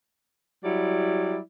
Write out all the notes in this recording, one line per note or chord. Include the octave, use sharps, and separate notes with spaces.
F#3 G3 E4 D5